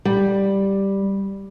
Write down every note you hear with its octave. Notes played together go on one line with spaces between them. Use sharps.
G3